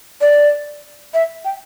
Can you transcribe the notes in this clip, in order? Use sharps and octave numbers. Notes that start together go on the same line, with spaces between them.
D5
E5
G5